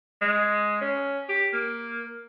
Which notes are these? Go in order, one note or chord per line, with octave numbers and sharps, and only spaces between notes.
G#3
C#4
G4
A#3